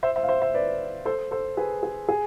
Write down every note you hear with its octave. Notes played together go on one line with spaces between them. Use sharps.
C5 E5
C5 E5
F5
C5 E5
C5 E5
B4 D5
A4 C5
A4 C5
G#4 B4
G#4
G#4